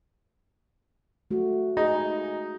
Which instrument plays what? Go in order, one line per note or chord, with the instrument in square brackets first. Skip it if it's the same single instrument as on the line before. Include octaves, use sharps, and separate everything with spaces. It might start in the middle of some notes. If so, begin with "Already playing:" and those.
[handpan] A3 F#4
[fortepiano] D#4 [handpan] G#4